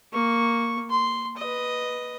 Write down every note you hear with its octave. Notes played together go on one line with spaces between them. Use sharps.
A#3 C#6
C6
B4 D#5